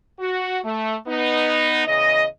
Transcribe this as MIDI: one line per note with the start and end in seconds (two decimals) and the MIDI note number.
0.19 0.57 66
0.63 0.94 57
1.06 1.84 59
1.06 1.84 63
1.86 2.24 40
1.86 2.24 49
1.86 2.24 75